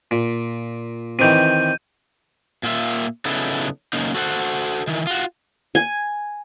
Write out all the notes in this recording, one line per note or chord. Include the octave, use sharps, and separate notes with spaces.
A#2
C3 D#3 E3 G6 D#7
A#2 A#3 F4 E5
C#3 F#3 B3 D#4 E4 A4
F#2 C#3 A#3 D#4
F#4 A4 C5 F#5
D#3 E3
F4 F#4
G#5